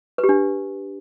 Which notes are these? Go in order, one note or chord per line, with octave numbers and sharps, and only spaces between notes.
B4
G4
D4